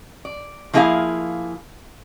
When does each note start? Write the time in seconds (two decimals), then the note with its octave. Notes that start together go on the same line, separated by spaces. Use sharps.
0.25 D5
0.73 F3 A#3 E4 G#4 A#4 F5